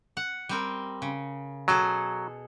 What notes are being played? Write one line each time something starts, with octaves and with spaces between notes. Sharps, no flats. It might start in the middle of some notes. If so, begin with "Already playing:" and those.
F#5
G3 C4 A#4
C#3
B2 F#3 G#4 A4